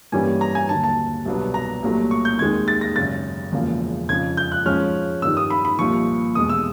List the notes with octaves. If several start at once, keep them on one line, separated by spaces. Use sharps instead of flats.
G2 E3 G3 A#3 C#4 G#5
A#5
G#5
D#2 D3 F#3 A5
A5
C2 B2 F#3 B3 D4
A#5
C2 A#2 F#3 A3
C#6
G6
D#2 D#3 G#3 C4 G#6
A6
A#6
G#1 F#2 C#3 A6
E1 E2 C#3 F3 A#3
F2 C#3 F3 G#6
G6
F#6
G#2 F3 G#3 C#4 F6
G2 D#3 G3 E6
D#6
B5
B5
C2 A#2 F3 C#6
E2 B2 G#3 D#6
E6